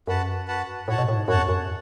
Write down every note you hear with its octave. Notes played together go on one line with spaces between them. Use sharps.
F#2 F#4 B4 F#5 A5
F#4 B4 F#5 A5
A2 F#4 C#5 F#5 A5
B2
A2
G#2
F#2 F#4 C#5 F#5 A5
E2
F#2